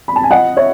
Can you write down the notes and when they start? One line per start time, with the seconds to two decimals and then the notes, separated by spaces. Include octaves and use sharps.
0.08 B5
0.16 A5
0.23 G#5
0.31 D#5 F#5
0.56 C#5 E5